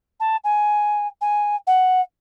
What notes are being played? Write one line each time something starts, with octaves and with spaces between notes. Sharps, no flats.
A5
G#5
G#5
F#5